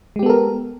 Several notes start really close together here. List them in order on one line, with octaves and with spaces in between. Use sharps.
G#3 G4 B3 A4 A#4